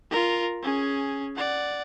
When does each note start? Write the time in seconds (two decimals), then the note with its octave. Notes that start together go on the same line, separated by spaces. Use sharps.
0.11 F4 A#4
0.62 C#4 G#4
1.36 D5 F#5